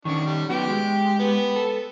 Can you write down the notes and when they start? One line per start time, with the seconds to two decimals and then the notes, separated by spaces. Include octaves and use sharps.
0.05 D#3 C#4 D4 C#6
0.26 G3
0.50 F#3 B3 G4 G5
0.68 G#3
1.19 B3
1.56 A4